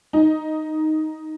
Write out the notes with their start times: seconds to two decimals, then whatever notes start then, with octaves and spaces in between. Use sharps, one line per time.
0.13 D#4